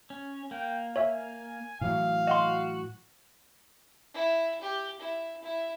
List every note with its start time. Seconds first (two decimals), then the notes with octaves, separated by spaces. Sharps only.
0.10 C#4
0.51 A#3 G5
0.96 C#5 E5 G#5
1.81 A2 E3 F#3 F5
2.27 F#4 D#5 F#5 C6
4.14 E4
4.61 G4
5.00 E4
5.42 E4